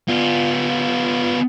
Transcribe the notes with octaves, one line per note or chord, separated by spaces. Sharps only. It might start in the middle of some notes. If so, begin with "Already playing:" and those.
B3 F4